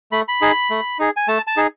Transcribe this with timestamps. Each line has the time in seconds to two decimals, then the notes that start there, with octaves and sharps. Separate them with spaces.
0.12 A3 B5
0.28 B5
0.41 D#4 G#4
0.70 A3
0.99 D#4 G#4
1.17 G#5
1.28 A3 A5
1.47 A5
1.57 D#4 G#4